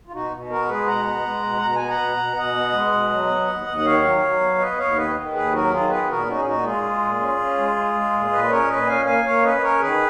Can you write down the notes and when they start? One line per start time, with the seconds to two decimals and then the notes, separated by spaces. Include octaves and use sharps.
0.07 F4
0.12 B2 D#4 F#4
0.32 B2
0.49 B3 F#4 A#4
0.69 G#3 G#4 B4
0.87 B2 F#5 A#5
1.06 B3
1.24 G#3
1.43 B2
1.62 B2 A#5
1.75 G#5
1.80 B3
1.88 F#5 A#5
1.99 B2
2.17 B2
2.37 B2 D#5 F#5
2.55 B3
2.73 G#3
2.91 B2
3.10 F#3
3.29 B3
3.47 D#2
3.67 D#2
3.77 F#5
3.85 D#3 C#5 F5
4.03 F#3
4.23 F#3
4.40 B3
4.59 B3 B4 D#5
4.78 D#2 C#5 F5
4.96 D#3 B4 D#5
5.16 D#3
5.33 D#2 G#4 B4
5.52 F#3 F#4 A#4
5.71 D#3 F4 G#4
5.89 B3 G#4 B4
6.08 A#2 F#4 A#4
6.26 C#4 D#4 F#4
6.38 G#4
6.45 A#2 D#4 F#4
6.64 G#3 F4 G#4
6.83 G#3
7.02 A#2
7.19 C#4
7.39 C#4
7.57 G#3
7.76 G#3
7.94 G#3
8.13 A#2
8.31 A#2 B4 D#5
8.49 C#4 A#4 C#5
8.68 A#2 B4 D#5
8.87 C#4 F5 G#5
9.05 A#3 F5 G#5
9.24 A#3 C#5 F5
9.42 C#4 B4 D#5
9.56 D#5
9.61 C#4 A#4 C#5
9.80 D#3 G#4 B4